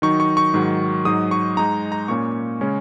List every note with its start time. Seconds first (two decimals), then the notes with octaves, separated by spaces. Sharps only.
0.02 D#3 F#3 D#4 C#6
0.20 C#6
0.37 C#6
0.54 G#2 D#3 F#3
1.05 G#2 F#3 D#4 D#6
1.31 C#6
1.57 G#2 G#3 D#4 A#5
1.92 A#5
2.08 A#2 A#3 C#4 C#6
2.61 C#3 G#3 C#4